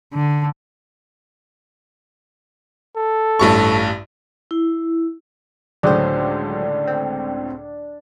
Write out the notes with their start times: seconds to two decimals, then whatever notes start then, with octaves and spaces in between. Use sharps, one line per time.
0.14 D3
2.97 A4
3.39 A1 G2 C#6
4.51 E4
5.83 C#2 A2 D3 F#3 D4 G#4 C5
6.87 C4